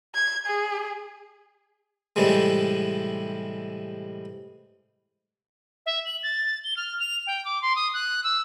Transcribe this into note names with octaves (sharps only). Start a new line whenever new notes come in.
G#6
G#4
A2 C3 E3 G3 G#3
E5
F#7
A6
G7
F6
F7
G5
D6
C6
D#6
F#6
E6